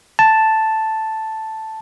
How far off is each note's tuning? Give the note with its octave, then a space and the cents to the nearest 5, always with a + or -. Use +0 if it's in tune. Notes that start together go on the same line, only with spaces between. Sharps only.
A5 +0